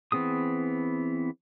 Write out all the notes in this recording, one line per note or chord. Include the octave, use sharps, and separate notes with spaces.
E3 B3 C4 G#4 D#6